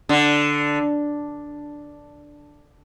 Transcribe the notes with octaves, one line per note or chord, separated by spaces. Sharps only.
D3